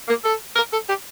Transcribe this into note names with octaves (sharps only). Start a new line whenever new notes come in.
A#3
A4
A#4
A4
G4